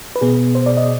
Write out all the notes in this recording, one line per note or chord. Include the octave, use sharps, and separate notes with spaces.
B4
B2 B3 G#4
C5
D5
D#5